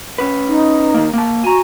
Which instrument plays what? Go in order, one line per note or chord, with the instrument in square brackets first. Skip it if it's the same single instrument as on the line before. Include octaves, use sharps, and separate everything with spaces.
[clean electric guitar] C#4 B4
[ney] D#4
[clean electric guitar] D#3 A#3
A#3 A5
[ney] F#4 [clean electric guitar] G#5 A#5